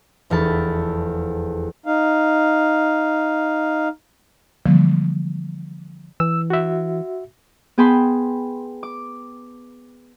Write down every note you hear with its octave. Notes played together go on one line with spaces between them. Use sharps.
F1 E2 F5 A5 B5
D#4 F5
D3 E3 F3 G3 G#3 A#3
E3 E6
F#4 E5
B3 G#4 G5 A5 B5 C6
D6